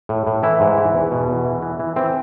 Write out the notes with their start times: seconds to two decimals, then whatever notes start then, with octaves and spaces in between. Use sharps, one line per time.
0.09 A2
0.26 A2
0.43 E3 E4
0.60 G#2
0.78 E3
0.94 E2
1.11 B2
1.28 E2
1.45 E3
1.62 E3
1.79 E3
1.96 E3 C4